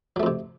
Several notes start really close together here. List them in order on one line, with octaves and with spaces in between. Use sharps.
F#3 A3 F2 C3